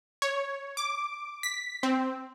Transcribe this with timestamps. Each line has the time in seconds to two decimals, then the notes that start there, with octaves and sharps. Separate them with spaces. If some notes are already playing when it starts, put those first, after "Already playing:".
0.22 C#5
0.77 D6
1.43 B6
1.83 C4